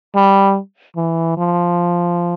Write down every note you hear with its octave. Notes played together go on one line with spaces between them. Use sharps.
G3
E3
F3